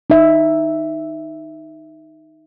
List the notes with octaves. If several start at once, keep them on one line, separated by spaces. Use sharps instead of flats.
D#4 E5